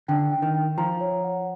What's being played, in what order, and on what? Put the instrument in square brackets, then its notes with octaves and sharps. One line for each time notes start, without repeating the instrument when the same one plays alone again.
[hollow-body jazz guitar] D3 [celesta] G5
[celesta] G5
[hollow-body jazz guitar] D#3
[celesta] G5
[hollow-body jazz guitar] F3 [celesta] A#5
[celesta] C#5
F#5